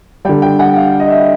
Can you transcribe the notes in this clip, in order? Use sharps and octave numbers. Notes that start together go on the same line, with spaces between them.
D3 G3 G5
G5
F#5
F5
D#5
E5